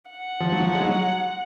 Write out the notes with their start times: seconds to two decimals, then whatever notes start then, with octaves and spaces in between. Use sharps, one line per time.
0.10 F#5
0.40 F3
0.52 F#3
0.61 F3
0.74 G#3
0.80 F#3